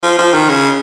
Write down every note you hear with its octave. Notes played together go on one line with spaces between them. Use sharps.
F3
F3
D#3
C#3